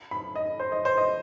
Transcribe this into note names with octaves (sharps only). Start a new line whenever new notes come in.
B5
D#5
C5
D#5
C5
D#5